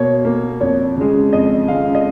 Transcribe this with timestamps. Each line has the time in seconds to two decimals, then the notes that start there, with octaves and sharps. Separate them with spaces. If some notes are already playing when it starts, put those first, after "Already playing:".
Already playing: B2 A#3 C#5
0.25 A#3
0.61 F2 C#5
0.96 C#3 G#3
1.33 F2 D#5
1.68 C#3 G#3 F5
1.95 D#5